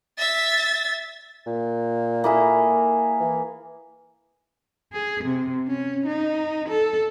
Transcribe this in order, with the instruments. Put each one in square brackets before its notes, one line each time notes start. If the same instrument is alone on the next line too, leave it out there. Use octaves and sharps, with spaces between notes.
[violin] E5 A6
[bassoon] A#2
[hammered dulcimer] A#3 E4 G#4
[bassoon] E3
[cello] G#4
C3
C#4
D#4
A4